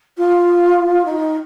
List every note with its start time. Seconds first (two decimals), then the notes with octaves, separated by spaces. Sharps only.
0.17 F4
1.05 D#4